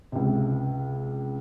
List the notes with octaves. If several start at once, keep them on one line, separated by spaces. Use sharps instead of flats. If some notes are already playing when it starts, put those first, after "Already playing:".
C#2 C3